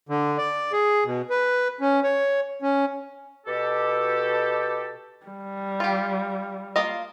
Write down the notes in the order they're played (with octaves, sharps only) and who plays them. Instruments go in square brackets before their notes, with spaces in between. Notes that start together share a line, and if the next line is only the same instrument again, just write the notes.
[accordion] D3
D5
G#4
B2
B4
C#4
C#5
C#4
[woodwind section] B2 G4 A4
[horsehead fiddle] G3
[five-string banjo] F4 G4
A#3 F4 D#5